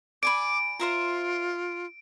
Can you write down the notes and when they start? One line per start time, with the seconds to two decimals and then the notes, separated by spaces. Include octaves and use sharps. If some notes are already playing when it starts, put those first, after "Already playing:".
0.23 D5 G#5 B5 D6 D7
0.80 F4 C5 E5 A#5